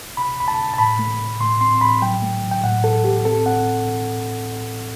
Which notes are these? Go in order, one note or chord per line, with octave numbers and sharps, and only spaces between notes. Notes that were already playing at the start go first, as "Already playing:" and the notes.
C3 B5
C2 B5
A5
C3
A5
A2 B5
A3
A2
A2 C6
C4 C6
A2 B5
F#3 G5
A3
F#3
G5
A2 F#5
A2 A4
A2 G4
C4 A4
C4 F#5